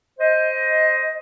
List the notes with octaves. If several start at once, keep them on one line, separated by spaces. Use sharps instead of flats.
C5 D#5